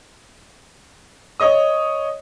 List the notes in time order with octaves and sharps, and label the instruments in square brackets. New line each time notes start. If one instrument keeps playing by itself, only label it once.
[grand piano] C#5 D#5 D#6